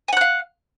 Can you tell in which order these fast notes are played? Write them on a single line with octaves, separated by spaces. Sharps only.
G#5 F#5 F#6 F5